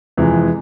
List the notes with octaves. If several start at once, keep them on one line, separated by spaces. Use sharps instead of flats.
F2 C3 E3 G#3